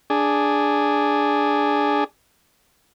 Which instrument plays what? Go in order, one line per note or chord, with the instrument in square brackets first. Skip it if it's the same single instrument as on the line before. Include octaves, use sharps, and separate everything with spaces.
[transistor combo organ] D4 G#4